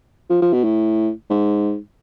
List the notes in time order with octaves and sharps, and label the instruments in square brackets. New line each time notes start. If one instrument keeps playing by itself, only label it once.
[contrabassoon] F3
F3
B2
A2
G#2